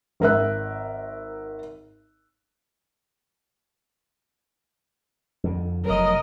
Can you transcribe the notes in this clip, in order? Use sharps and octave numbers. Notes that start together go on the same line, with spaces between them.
G#1 A#4 E5 F#6
F2 D3
F1 F#3 A#4 D#5